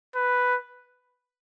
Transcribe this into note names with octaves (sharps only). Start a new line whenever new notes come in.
B4